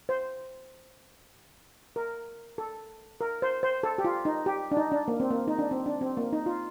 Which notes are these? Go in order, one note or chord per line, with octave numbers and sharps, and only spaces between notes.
C5
A#4
A4
A#4
C5
C5
A4
G4
F4
D#4
G4
D4
D#4
D4
A#3
C4
A#3
D#4
D4
C4
D4
C4
A#3
D#4
F4